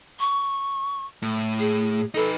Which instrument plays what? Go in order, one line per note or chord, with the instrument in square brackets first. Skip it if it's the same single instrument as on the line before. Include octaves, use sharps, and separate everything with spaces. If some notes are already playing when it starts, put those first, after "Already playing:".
[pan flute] C#6
[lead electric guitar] A2
[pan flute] G#4
[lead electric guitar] D#4 B4 [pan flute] A4